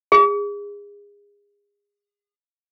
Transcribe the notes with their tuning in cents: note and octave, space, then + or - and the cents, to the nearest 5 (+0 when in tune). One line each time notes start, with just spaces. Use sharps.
G#4 -30